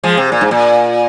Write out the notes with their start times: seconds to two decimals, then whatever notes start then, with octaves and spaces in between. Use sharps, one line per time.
0.04 F3 G#3
0.17 C3
0.32 A#2
0.41 G#2
0.51 A#2